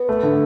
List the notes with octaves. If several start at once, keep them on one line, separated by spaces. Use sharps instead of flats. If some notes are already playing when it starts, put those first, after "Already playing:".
Already playing: B3
A3
D3